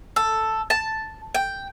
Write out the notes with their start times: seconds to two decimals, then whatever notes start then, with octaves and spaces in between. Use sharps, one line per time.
0.16 A4
0.70 A5
1.35 G5